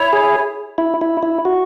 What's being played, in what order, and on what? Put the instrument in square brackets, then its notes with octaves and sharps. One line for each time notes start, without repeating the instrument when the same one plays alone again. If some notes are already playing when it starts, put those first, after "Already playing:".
Already playing: [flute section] E4 C#5 E5
[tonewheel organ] G#4
E4
E4
E4
F#4